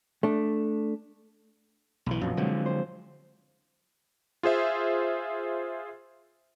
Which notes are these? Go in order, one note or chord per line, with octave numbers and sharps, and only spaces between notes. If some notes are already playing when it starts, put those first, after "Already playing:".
A3 D4
B1 E3
A#1 F#2 B2 F3 F#3
D3 F#3 G#3 C4
C5
F4 G#4 C5 E5